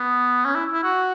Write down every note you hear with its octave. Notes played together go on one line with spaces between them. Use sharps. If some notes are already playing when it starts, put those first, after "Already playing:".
Already playing: B3
C#4
E4
E4
F#4